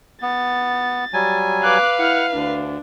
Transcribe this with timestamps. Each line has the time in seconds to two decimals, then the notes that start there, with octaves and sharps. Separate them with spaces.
0.22 B3 A6
1.13 F#3 G3 G#5
1.63 B4 F5 D6 F#6
1.99 E4 F#5 F6
2.33 D2 D4